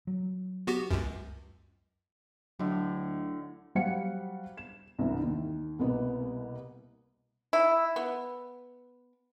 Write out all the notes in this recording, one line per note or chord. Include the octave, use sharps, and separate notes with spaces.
F#3
B3 F#4 G4
C#2 F#2
D2 A2 D3 F#3 D#5
F#3 G3 C5 F5 F#5 C#7
E7
C2 G2 E3
D#2 D#3
C2 B2 A#3 B3
E4
B3